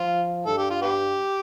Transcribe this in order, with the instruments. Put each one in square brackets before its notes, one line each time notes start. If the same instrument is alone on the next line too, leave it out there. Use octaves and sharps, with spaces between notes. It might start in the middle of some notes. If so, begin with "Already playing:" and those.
Already playing: [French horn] F3 [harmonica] F4
[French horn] G2 [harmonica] A4
[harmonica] G4
F4
B3 G4